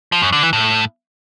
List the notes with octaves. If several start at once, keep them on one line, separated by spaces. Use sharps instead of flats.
F3
F#2
D3
E3
A2